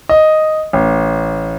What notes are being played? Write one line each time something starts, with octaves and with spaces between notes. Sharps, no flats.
D#5
A1